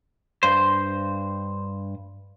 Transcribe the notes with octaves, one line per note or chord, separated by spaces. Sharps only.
G2 C5